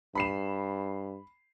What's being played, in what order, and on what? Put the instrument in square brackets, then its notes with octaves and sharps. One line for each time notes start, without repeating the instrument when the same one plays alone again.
[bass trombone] G2 [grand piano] B5 C7 E7